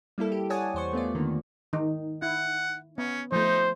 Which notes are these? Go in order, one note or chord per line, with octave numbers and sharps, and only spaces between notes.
G3 A#3 E4 A4
G4
C#5 D5 F#5 G#5 A5 D#6
E2 C5 C#6
A3 B3 F4 D5
D3 D#3 A#3
D#3 D#4
E4 F#5
B3 C#4
F3 A3 D#4 C5